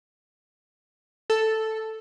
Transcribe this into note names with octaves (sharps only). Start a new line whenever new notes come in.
A4